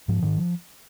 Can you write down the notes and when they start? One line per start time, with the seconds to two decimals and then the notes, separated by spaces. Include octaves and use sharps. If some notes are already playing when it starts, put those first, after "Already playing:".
0.08 G#2 F3
0.22 G#2 D#3
0.38 F3